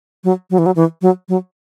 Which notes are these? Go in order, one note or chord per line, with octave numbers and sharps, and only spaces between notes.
F#3
F#3
E3
F#3
E3
F#3
F#3